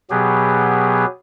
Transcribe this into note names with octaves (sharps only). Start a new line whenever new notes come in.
B2 F#3 B3 G4 G#4